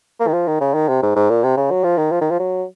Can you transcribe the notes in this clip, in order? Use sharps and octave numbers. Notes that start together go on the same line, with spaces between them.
A#3
D#3
F3
D#3
C#3
D#3
C3
G#2
G#2
A#2
C3
C#3
F#3
F3
D#3
F3
D#3
F3
F#3